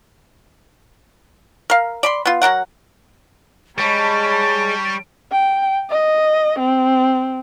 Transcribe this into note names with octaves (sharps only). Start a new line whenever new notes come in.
A#4 F5
D5 B5 C6
B3 F4
F#3 D4 A#4 F#5
G3 G#3 C#5 A5 B5 C#6
G5
D#5
C4